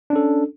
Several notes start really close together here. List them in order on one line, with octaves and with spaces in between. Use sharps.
D4 C#4 A4